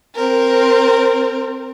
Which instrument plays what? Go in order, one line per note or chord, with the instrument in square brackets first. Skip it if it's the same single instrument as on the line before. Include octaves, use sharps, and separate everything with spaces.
[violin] C4 A#4